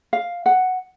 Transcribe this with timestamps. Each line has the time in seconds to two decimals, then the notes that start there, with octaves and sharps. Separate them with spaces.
0.13 F5
0.46 F#5